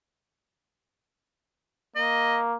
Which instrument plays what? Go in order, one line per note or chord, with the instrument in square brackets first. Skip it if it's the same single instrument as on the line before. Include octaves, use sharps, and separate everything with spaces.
[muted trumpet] A#3 [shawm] D#5